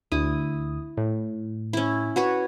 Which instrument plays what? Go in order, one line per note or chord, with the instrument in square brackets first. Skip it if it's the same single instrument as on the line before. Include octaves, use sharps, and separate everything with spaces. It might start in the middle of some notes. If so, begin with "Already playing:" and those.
[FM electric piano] D2 D#6 [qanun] E4
[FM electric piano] A2
[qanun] C#4 E4
F#4 B4 C#5